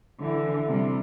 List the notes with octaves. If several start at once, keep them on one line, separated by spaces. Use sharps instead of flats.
D3 E3
C3 G3